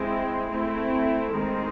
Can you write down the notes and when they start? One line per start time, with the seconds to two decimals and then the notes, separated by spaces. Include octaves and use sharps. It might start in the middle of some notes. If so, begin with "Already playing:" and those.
Already playing: G#3 C4 E4
0.50 A3 C4 E4
1.33 D#3 G#3 C4